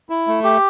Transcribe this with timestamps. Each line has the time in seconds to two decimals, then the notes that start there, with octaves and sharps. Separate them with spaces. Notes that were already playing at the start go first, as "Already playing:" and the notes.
0.09 E4
0.27 A3
0.44 G4